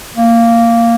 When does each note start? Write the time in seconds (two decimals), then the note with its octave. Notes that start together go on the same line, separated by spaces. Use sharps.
0.16 A#3